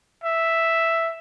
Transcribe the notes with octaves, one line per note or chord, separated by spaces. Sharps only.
E5